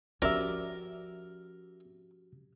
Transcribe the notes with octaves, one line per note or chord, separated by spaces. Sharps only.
F3 C#4 F#4 G4 A#4 D5 E5